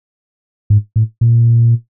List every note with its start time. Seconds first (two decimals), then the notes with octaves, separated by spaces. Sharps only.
0.70 G#2
0.96 A2
1.21 A#2